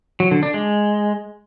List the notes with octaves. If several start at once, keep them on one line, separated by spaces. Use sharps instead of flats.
F#3
D3
D4
G#3